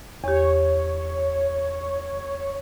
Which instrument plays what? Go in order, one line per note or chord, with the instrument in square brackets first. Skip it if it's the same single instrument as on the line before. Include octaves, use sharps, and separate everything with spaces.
[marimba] E2 G4 [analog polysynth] C#5